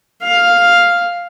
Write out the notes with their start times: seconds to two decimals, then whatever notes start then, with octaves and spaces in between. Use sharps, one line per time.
0.23 F5